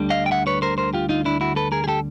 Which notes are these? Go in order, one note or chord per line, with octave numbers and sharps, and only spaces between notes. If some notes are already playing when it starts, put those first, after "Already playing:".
Already playing: D2 D3 G3
D#5 F5
G5
E5 F#5
B4 C#5
A#4 C5
A#4 C5
F4 G4
D#4 F4
D4 E4
E4 F#4
A4 B4
G#4 A#4
G#4
G4 A4